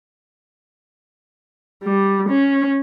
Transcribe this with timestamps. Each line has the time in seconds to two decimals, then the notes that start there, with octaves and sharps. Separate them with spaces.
1.83 G3
2.30 C#4